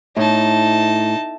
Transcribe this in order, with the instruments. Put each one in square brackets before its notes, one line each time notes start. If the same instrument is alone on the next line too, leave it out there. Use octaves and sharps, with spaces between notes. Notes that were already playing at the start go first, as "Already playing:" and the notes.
[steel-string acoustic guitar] A2 [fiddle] D#4 A5